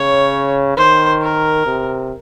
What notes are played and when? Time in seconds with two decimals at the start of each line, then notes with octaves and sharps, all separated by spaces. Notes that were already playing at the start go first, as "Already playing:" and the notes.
Already playing: C#3 C#5
0.77 D#3 C5
1.22 A#4
1.66 C3